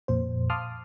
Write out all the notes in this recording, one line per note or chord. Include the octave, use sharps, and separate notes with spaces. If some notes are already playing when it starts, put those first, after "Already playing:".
F2 A#2 C5
F5 A5 C6 D6 D#6 F6